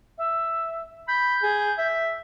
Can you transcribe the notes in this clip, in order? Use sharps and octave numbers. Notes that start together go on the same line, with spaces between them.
E5
B5 G6
G#4
E5